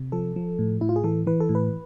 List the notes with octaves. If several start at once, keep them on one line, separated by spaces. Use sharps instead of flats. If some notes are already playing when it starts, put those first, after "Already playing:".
Already playing: C3
F3 A4
F3
A2
A2 E4
F4
G#4
E3 A4
E3 B4
A4
A2
B4